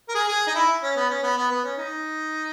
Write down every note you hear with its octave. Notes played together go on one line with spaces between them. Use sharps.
A#4
G#4
G#4
D#4
E4
C#4
B3
C#4
B3
B3
B3
C#4
D#4